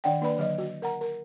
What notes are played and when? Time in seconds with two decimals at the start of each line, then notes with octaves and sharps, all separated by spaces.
0.04 D#3 D4 D5 F#5 G5
0.21 A#3 D4 B4 D5 B5
0.37 D3 F#3 D#5
0.58 F#4
0.82 A#4 F#5 A#5
1.01 A#4